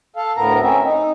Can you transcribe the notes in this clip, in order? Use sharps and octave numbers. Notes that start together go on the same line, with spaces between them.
A4 F5
D2 A2 B3 A#4 A#5
C4 C#4 E5
D#4